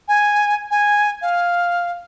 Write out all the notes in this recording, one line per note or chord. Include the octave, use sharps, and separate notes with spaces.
G#5
G#5
F5